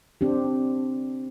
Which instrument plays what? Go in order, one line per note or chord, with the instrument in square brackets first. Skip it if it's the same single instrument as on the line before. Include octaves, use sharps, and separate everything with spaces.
[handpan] C4 D4 G4